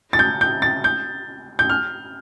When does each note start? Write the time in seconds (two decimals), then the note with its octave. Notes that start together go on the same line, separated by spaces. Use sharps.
0.13 A6
0.19 G6
0.41 G6
0.62 A6
0.84 G6
1.59 G6
1.69 F6